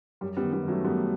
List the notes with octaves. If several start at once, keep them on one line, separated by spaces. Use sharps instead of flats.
F#2 G3
G3 B3
D#3
G3 B3
D#3
F#3 A3
F#2 G3 B3